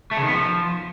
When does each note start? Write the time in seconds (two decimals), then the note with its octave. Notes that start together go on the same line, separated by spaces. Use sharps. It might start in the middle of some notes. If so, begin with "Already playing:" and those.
0.11 A3
0.17 C#3
0.23 D#3
0.28 B3
0.34 F3